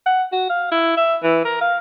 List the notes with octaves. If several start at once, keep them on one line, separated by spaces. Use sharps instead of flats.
F#5
F#4
F5
E4
E5
E3
A#4
F5